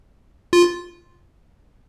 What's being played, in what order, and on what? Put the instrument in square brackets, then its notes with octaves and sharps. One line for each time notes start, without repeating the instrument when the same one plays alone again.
[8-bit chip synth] F4